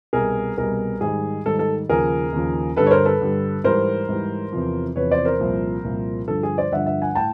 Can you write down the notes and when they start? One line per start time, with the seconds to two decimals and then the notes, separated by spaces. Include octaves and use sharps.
0.13 C2 B2 G3 G#4 A#4
0.57 C2 B2 G3 G#4 A#4
1.01 G#2 D#3 G3 G#4
1.46 G#2 D#3 G3 A4
1.59 A4
1.89 D#2 C#3 F3 G#4 A#4
2.33 D#2 C#3 F3
2.76 G2 D3 G3 A4 B4
2.87 C#5
2.91 A#4 C5
3.06 A4 B4
3.21 G2 D3 G3
3.64 G#2 E3 G3 A#4 C5
4.09 G#2 E3 G3
4.52 E2 C3 F3
4.96 E2 C3 F3 B4 C#5
5.11 C5 D5
5.25 A#4 C5
5.40 C2 A#2 F3
5.84 C2 A#2 F3
6.28 G2 D3 F3 A4
6.43 G#4
6.58 C5 D5
6.71 G2 D3 F3 E5 F#5
6.86 E5 F#5
7.02 F#5 G#5
7.15 A2 G5 A5